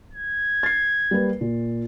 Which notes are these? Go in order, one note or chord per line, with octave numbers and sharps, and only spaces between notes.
G#6
A6 C7
G3 A#3 B4
A#2